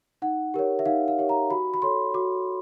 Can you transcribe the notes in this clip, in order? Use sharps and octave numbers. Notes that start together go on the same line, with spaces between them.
D#4 F#5
G4 A#4 C#5
E5
D#4 F5
F5
G4 A#4 C#5
A#5
F#4 B5
B5
A4 C#5 C6
F#4 D6